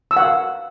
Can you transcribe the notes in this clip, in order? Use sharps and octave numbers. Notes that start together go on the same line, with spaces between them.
E6
F#5
F5